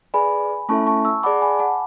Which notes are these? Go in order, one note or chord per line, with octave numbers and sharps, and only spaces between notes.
G#4 B4 D5 G#5 B5
A3 C#4 E4 A4 E5 A5 C#6
A5 C#6
C#6 E6
G#4 D5 F#5 A5 B5 D6
G#5 B5
F#5 A5